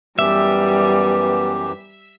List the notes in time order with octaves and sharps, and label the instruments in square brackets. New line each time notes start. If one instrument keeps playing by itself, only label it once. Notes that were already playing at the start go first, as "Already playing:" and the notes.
[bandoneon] F#2 E3 G4 [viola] G3 [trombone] B3 [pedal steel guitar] E5